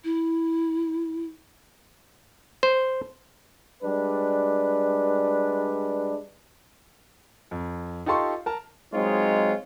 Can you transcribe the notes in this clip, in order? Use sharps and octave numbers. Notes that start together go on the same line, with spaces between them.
E4
C5
G3 G#3 D4 B4
F2
D#4 F4 G4 A4 C6 C#6
A#4 A5
F#3 G#3 C4 D#4 F4 C#5